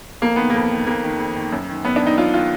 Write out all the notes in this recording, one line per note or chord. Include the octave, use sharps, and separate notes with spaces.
F2 A#3
D#3 B3
F2 A#3
D#3
F2 A#3
D#3
F2
D#3
F#2
D#3
F#2 B3
D4
D#3 D#4
F#2 F4
D#3 F4